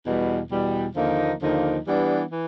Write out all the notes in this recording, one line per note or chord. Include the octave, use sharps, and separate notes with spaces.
E2 B2 G3
E2 B2 G3
D#2 D3 F3 A#3 D#4
D#2 D3 F3 A#3 D#4
E3 G3 B3 D4
E3